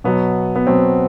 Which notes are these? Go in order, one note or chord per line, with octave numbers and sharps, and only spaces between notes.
B2 F#3 B3
B3
B2 F#3 C4